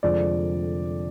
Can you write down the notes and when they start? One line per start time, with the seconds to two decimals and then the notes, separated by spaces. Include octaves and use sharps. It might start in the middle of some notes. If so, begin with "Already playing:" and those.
0.03 F1 F2 D3 F3 G#3 D5